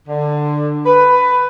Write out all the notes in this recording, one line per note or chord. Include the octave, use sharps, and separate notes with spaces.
D3
B4